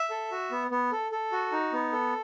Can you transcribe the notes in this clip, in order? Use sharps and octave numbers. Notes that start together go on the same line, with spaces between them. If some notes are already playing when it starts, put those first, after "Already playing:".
Already playing: E5
A4
F#4
B3
B3
A4
A4
F#4
D#4
B3
A4